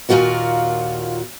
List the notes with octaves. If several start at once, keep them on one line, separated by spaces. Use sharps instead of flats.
D#2 A#2 F3 F4 F#4 A#4